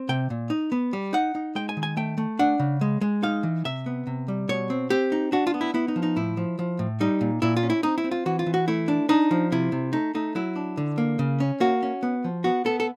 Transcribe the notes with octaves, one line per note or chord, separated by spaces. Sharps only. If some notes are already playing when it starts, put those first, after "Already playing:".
Already playing: C4
C3 G5
A#2
D#4
B3
G3
D#4 F#5
D#4
G#3 G5
G#5
D#3
G#5
A3 G5
A3
D4 F#5
C#3
G#3
G#3
D#4 F5
E3
C3 E5
B3
C3
G3
B2 C#5
C4
C4 G4
D#4
D4 F#4
F4
B3
E4
B3 E4
D#4
F3
D#4
A2 E4
F3
F3
A2
G3 D#4
A#2
A#2 E4
F4
C#4
E4
C4 D#4
E4
C4
F4
E3 F#4
F4
E3
F#4
A3 E4
D4
D4 D#4
F3
C3 E4
C3
A3 D#4
A3 D#4
F#3 E4
D4
D3
A#3
C#3
C#4
A#3 F#4
C#4
B3
F3
B3 F#4
B3 A4
A4